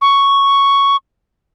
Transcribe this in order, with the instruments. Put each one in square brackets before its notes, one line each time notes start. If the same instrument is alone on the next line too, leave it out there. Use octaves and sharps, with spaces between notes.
[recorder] C#6